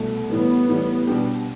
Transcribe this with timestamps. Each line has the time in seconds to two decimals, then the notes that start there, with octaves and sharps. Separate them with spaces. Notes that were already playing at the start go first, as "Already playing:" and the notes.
Already playing: C2 B2 A3
0.29 A2 E3 G3 B3
0.68 A2 E3 G3
1.07 B2 G3 D4 G4